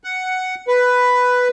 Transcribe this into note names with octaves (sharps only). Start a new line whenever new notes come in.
F#5
B4